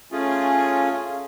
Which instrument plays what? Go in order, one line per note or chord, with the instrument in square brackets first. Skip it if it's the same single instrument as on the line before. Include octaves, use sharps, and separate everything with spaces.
[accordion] A3 C#4 F4 G#4